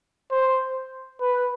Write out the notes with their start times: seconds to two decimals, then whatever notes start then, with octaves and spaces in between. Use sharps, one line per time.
0.31 C5
1.21 B4